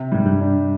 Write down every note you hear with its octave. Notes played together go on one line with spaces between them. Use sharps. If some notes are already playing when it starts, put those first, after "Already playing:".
Already playing: C3
G#2 G3
G2
D4